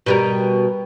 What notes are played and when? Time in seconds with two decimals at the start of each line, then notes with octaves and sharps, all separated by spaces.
0.06 B2 G3 A#4